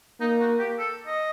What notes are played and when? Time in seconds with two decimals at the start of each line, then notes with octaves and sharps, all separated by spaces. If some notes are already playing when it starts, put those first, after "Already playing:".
0.20 A#3 D#4
0.40 F#4
0.59 G4
0.78 A4
1.06 D#5